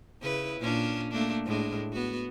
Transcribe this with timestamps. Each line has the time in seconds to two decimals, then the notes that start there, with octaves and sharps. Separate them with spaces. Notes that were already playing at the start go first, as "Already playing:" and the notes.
0.22 C#3 E4 B4
0.60 A#2 C#4 D4
1.12 A3 A#3 D4
1.45 A2 G#3 D4
1.93 B3 F#4